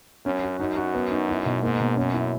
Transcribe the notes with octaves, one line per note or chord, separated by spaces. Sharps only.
F#2 C#4
F#4
F#2 D#4
F#4
B3
D#4
E4
B2
G#2 A#3
B2
F#2 C#4
E4